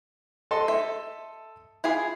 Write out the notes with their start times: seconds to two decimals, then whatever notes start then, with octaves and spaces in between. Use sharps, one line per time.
0.51 A4 D#5 C6
0.68 E5
1.84 E4 F4 G#4